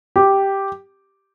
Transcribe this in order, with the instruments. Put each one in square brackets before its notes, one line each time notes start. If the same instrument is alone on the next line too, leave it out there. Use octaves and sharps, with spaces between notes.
[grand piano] G4